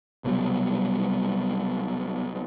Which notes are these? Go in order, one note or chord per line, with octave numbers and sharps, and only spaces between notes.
C2 B2 F#3 G3